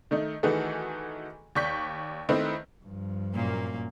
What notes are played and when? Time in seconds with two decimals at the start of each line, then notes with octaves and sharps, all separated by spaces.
0.11 D#3 A3 D#4
0.43 D#3 E3 A3 F#4 G#4 A4
1.55 D#2 D5 C#6 G6 B6
2.29 D#3 A3 C4 D#4 E4 B4
2.84 G2 F3
3.34 F#2 A#2 A#3